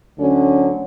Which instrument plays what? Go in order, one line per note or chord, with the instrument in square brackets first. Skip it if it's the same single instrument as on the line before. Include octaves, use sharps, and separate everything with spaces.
[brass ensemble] D2 D3 F#3 C#4